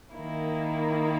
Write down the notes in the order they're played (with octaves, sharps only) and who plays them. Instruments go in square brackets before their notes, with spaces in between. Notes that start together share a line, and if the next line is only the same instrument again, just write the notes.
[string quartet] D#3 A#3 E4